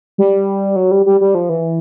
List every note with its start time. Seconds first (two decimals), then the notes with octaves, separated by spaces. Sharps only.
0.18 G3
0.76 F#3
0.91 G3
1.06 G3
1.21 G3
1.35 F3
1.49 E3